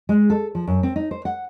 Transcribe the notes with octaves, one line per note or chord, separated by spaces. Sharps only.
G#3
A4
F3
F#2
C4
D#4
C5
F#5